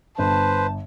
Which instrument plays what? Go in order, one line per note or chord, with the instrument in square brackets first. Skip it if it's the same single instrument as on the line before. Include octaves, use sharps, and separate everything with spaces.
[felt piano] G1 [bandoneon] B4 C5 [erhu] A5